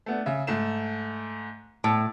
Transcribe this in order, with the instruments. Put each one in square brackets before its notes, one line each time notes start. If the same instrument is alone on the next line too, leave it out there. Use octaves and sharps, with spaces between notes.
[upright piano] A3 B3 D4
C#3 E5
G#2 A3 E7
[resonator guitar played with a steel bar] A2